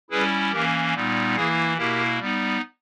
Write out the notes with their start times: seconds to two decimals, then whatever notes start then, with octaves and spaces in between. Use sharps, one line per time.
0.10 G3 C#4 E4 G#4 B4
0.52 E3 A#3 C#4 G4 A#4
0.94 A#2 G3 B3 D#4
1.35 E3 A#3 E4 G#4
1.77 B2 A#3 E4 G4 A#4
2.19 G3 B3 D#4